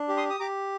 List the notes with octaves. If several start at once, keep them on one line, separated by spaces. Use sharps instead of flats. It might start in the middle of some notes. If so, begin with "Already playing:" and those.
Already playing: D4
G4
C6 D#6
D#6
G4 A#5 D6